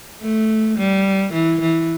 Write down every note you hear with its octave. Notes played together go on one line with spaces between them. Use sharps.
A3
G3
E3
E3